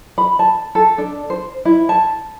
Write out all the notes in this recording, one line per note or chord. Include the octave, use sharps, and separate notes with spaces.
B5
A5
A4
D4
C5
E4
A5